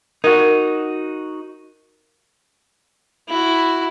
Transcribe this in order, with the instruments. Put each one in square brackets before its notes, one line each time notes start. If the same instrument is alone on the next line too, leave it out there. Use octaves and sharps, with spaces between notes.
[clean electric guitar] D#4 F#4 [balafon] A#4
[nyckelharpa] E4 F#4